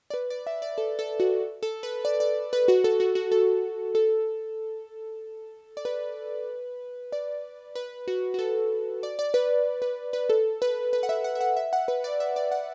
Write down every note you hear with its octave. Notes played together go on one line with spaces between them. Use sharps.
D5
B4
D5
E5
D5
A4
A4
F#4
A4
B4
D5
D5
B4
F#4
A4
F#4
F#4
A4
A4
D5
B4
D5
B4
F#4
F#4
A4
D5
D5
B4
B4
B4
A4
B4
B4
F#5
E5
F#5
E5
F#5
E5
F#5
B4
D5
E5
D5
F#5